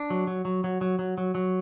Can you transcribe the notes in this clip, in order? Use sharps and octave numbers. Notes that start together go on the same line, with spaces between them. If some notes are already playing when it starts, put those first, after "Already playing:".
Already playing: D4
F#3
F#3
F#3
F#3
F#3
F#3
F#3
F#3